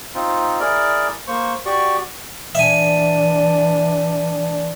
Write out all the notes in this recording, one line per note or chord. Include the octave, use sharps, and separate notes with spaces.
C4 D#4 F4
E4 G#4 A#4 D5
A#3 C5 C#6
F#4 G4 D5 C#6
E3 D4 E5 G#5